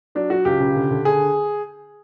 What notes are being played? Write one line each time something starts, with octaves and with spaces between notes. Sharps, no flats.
F#3 D4
F#3 F#4
C#2 G4
C#3
D3
D3
D3 G#4